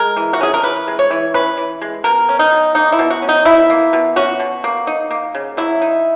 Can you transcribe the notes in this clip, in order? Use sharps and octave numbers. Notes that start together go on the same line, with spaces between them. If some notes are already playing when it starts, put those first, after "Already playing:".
Already playing: G#3 A#4
E3
F#4
C#4 G#4
A#4
E3 B4
G#3
C#5
E3
C#4 B4
E3
G#3
B2 A#4
C#4
D#4
B2
A#3 D#4
E4
B2
F#4
C#4
D#4
B2 E4
A#3
B2
C#4 F#4
B2
A#3
D#4
A#3
C#3
F#3 E4
D#4